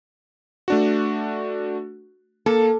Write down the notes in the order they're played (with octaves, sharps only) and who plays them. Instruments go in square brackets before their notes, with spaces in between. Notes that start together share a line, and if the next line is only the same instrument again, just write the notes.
[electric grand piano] A3 D4 F#4
[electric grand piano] A#3 [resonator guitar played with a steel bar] A4